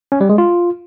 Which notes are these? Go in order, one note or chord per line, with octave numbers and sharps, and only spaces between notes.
C#4
G3
G#3
F4